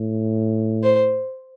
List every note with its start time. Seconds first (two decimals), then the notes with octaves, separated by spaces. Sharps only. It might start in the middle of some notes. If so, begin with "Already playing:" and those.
Already playing: A2
0.83 C5